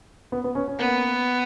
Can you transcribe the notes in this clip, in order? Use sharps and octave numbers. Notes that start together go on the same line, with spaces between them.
B3
B3
C#4
C#4
A#3 B3